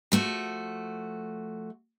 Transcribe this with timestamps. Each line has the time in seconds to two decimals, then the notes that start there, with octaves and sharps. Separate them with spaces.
0.12 F3 A3 F#4